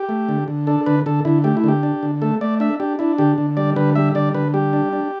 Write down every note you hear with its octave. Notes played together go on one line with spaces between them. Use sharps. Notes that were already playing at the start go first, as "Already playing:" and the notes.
Already playing: G4
A3
D3
D3
D4 A4
D3 B4
D3 A4
D3 E4
A3 G4
E4
D3 G4
D4
D3
A3 A4
A3 D5
D4 E5
D4 G4
D4 E4
D3 G4
D3
G3 D5
D3 B4
G3 E5
D3 D5
D3 B4
G3 G4
D4
D4